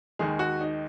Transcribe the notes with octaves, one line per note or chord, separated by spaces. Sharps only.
D#2 D#3 G#3 G#4
F#4
D#4